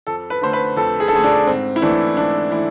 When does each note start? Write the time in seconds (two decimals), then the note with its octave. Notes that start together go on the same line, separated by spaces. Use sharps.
0.07 F2 A4
0.30 B4
0.42 D3 A3 C5
0.53 B4
0.76 F2 A4
1.00 G#4
1.08 A4
1.12 D3 A3 G#4
1.24 D4
1.47 G#2 C4
1.76 E4
1.82 E3 A3 C4 D4
2.17 G#2 D4
2.52 E3 A3 C4 E4